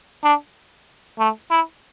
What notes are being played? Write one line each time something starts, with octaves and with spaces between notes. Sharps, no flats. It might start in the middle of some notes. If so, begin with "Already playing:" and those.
D4
A3
E4